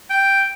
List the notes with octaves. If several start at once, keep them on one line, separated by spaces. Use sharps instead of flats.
G5